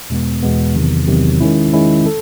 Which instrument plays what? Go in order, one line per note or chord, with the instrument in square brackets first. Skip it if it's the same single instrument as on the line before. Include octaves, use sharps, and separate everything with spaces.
[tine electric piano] E2 B2 G#3 B3
E2 B2 G#3 B3
E2 C3 D#3 F#3
E2 C3 D#3 F#3
D#3 G#3 C#4 E4
D#3 G#3 C#4 E4
A4